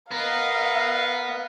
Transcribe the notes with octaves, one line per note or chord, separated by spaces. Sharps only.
B3 A#4 D#5 F5 A#5 C7